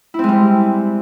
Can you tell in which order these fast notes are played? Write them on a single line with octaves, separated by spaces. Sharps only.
E4 C4 G#3 G3